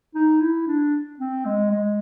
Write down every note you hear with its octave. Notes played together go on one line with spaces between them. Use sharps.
D#4
E4
D4
C4
G#3
G#3